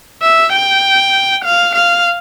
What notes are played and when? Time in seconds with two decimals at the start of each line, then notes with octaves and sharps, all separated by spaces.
0.23 E5
0.53 G5
1.45 F5
1.75 F5